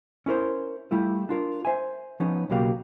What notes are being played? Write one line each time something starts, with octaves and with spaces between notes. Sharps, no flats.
C#4 E4 A#4 C5
G3 A3 E4 F4
D4 F4 A#4
C5 E5 G#5
F3 B3 C#4 D#4
B1 C#3 F#3 A#3 G4 F5